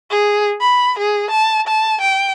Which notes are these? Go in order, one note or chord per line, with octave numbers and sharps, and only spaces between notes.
G#4
B5
G#4
A5
A5
G5